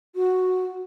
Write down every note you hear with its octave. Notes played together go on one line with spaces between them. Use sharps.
F#4